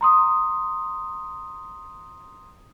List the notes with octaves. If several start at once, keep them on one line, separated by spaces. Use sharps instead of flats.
A#5 C6 D#6